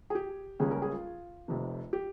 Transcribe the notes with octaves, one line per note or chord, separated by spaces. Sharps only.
G#4
G4
C#2 C#3 G3 A#3 C#4 G#4
A#4
G#4
F4
F1 F2 C3
G4